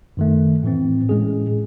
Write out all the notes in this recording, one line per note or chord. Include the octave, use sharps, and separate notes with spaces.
F#2 D#3 A3
A2 E3 C4
A2 G#3 C#4 G#4